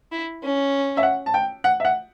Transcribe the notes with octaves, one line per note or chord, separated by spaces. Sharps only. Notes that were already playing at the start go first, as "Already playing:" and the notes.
E4
C#4
E5
F#5
A5
G5
F#5
E5
F#5